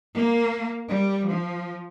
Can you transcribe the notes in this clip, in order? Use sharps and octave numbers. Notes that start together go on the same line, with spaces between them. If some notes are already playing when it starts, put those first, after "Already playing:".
A#3
G3
F3